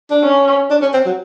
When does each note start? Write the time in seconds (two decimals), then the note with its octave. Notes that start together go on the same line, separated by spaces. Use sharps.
0.11 D4
0.23 C#4
0.70 D4
0.82 C#4
0.93 C4
1.06 F#3